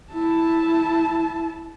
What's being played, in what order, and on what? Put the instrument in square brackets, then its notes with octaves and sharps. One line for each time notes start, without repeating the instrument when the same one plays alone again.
[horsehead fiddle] E4 A5